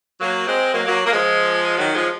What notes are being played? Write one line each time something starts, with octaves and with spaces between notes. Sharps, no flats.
F#3 A#3
G#3 C4
F#3 A#3
F#3 A#3
A#3
F3 G#3
D#3 F#3
F3 G#3